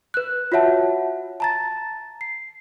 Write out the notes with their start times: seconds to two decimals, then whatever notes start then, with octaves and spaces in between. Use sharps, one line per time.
0.14 B4 F#6
0.52 F4 F#4 C#5 E5 F#5 A5
1.40 A5 A#5 A6
2.21 C7